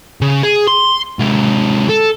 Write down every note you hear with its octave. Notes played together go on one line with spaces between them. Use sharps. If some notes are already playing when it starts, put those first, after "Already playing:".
C#3
G#4
C6
C3 G#3
A4